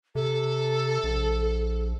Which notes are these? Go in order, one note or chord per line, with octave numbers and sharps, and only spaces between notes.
C3 A4
A#1